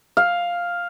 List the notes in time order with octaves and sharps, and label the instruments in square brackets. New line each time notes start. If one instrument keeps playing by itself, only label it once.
[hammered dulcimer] F5